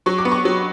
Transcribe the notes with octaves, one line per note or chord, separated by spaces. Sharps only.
F#3 C#6
D6
B3
C#6
F#3